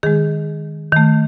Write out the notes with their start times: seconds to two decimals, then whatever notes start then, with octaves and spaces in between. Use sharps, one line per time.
0.03 D#3 G#3 G#4
0.92 D#3 A3